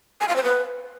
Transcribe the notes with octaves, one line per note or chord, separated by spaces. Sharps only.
G#5
F5
C5
B4